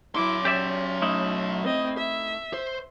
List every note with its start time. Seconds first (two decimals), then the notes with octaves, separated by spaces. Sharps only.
0.15 F#3 E4 C6 D6
0.45 C#4 G4 D5 E5
1.02 A3 D#4 E4
1.64 C4 D#5
1.98 E5
2.54 C5